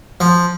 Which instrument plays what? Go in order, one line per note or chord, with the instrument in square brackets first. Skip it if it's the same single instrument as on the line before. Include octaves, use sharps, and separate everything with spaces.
[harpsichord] F3